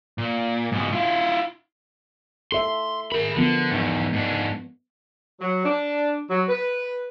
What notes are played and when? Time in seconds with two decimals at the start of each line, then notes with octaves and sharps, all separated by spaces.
0.18 A#2
0.72 G#2 B2
0.93 E4 F4
2.52 A4 E5 C6
3.12 G#4 A#4 B5
3.36 D3 F3 B3
3.70 E2 G#2
4.13 G#2 D4
5.40 F#3
5.65 D4
6.30 F#3
6.49 B4